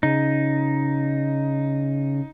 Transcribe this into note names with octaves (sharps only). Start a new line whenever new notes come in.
C#3 D#4